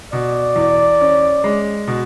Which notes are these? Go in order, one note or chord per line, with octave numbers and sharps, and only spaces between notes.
B2 D5
E2
C#4
G#3
B2